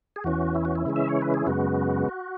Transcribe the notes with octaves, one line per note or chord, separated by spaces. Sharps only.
G#4
E2 E3 C#4 F#4
E4
F#4
E4
C#3 E3 G#3 C#4
E5
C#5
B4
G#4
F#2 C#3 G#3 B3 F#4